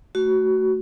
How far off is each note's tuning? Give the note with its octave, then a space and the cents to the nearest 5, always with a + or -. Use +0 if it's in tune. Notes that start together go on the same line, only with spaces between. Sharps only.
A3 +0 F#4 +20